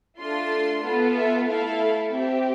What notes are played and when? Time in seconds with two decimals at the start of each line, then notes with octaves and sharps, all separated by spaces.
0.19 A3 D4 F4 C6
0.84 B3 F4 A4
1.16 E5
1.48 A3 E4 A4 F5
2.12 C4 E5
2.18 G4